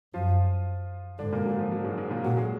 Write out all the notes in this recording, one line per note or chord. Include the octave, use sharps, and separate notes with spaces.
F#2 F3 F4
G#2 D3 D4
A#2 A#3
F#3
F3
F#3
G#2 G#3
G#2 G#3
A#2 A#3
A#2 F#3 F#4
G#3 G#4